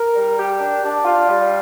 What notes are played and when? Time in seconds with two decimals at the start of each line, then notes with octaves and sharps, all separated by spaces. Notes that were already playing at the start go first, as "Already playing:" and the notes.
Already playing: A#4
0.15 G3
0.38 G4
0.60 D4
0.83 D4
1.05 F4
1.27 G3